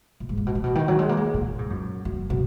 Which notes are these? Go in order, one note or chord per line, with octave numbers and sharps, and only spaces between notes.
A#2
G#2
A#2
B2
A#2
B2
D#3
F#3
G#3
A#3
G#3
A#2
G#2
F#2
F#2
B2